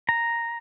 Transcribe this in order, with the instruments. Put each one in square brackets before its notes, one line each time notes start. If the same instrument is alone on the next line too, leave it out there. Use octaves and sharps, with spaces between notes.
[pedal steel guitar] A#5